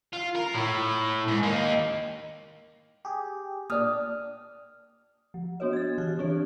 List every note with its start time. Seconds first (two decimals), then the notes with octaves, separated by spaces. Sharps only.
0.13 F4
0.36 A#4
0.54 A2
1.28 G#2
1.43 A#3 D#4
3.05 G4 G#4
3.70 A#2 D4 D#6 F6
5.34 F3
5.60 B3 D4 F#4 C#5 D#5
5.73 G#6 A6
5.98 E3 G4 F6 F#6
6.19 E3 C4 D4 G4 C#5